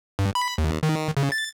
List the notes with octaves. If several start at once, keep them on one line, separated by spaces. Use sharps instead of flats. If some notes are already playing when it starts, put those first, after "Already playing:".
G2
B5
D#2
D#3
C#3
A6